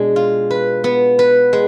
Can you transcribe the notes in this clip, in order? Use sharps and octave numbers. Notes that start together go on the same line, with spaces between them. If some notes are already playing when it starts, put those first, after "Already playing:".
Already playing: B2 G#3 D4
F4
B4
B3
B4
G#3